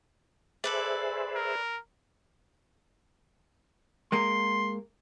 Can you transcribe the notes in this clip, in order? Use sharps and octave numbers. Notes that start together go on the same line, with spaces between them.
G#4 A4 B4 C5 D5 E5
A#4
G#3 A#3 A#4 C6